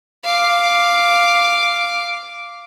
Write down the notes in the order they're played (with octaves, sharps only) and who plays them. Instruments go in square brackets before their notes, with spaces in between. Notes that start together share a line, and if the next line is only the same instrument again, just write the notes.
[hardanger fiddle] F5 D6